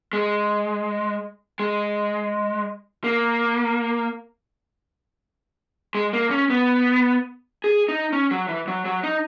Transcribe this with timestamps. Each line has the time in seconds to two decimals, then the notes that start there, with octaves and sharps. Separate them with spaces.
0.13 G#3
1.60 G#3
3.04 A#3
5.95 G#3
6.13 A#3
6.30 C#4
6.50 B3
7.64 G#4
7.88 D#4
8.13 C#4
8.31 F#3
8.48 E3
8.68 F#3
8.85 F#3
9.03 D#4